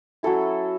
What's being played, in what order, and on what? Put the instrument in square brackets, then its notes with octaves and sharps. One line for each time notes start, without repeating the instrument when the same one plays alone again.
[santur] F#3 C#4 E4 A4